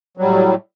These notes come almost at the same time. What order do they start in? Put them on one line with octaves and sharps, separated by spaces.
F#3 G3 A2